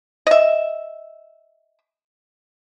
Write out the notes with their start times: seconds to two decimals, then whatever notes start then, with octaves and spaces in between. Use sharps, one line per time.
0.27 D#5 E5